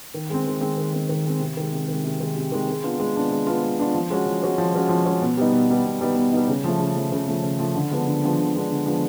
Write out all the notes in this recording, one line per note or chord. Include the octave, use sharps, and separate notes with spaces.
D#3
G#3 C4
D#3
G#3 C4
D#3
G#3 C4
D#3
G#3 C4
C3
D#3 G#3
C3
D#3 G#3
C3
D#3 G#3
C3
D#3 G#3
G#3
B3 D4 F4
G#3
B3 D4 F4
G#3
B3 D4 F4
G#3
B3 D4 F4
F3
G#3 C#4 F#4
F3
G#3 C#4 F#4
F3
G#3 C#4 F#4
F3
G#3 C#4 F#4
B2
G3 B3 D#4
B2
G3 B3 D#4
B2
G3 B3 D#4
B2
G3 B3 D#4
C#3
F3 A3
C#3
F3 A3
C#3
F3 A3
C#3
F3 A3
D3
F3 G#3 B3 D4
D3
F3 G#3 B3 D4
D3
F3 G#3 B3 D4
D3
F3 G#3 B3 D4